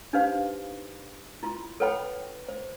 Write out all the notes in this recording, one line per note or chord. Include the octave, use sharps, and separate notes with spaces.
D4 D#4 G4 B4 C5 F5
E4 F4 C6
A4 B4 C#5 F#5 G5 B5
C5